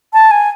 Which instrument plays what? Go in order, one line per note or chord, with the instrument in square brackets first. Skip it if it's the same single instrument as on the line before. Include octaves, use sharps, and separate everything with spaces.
[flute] A5
G#5